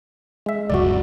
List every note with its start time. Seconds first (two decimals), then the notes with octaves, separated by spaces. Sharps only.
0.46 G#3 E5
0.70 D1 C#2 F#2 F#4 D5